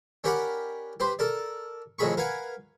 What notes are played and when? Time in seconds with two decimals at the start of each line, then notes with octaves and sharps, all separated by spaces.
0.24 C#4 G4 A#4 D5 F#5 B5
1.00 G4 B4 C5
1.19 A4 A#4 D5
1.99 F2 A2 D#3 G#4 B5 C#6
2.17 A#4 B4 F5 F#5 G#5